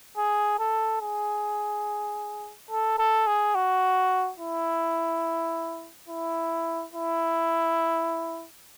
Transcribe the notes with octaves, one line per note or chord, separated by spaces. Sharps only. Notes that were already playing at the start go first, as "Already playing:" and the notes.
G#4
A4
G#4
A4
A4
G#4
F#4
E4
E4
E4